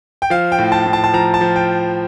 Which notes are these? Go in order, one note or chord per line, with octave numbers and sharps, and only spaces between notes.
G5
F3 F5
G5
A2
A5
A2
A5
A5
F3 A#5
A5
F3
G5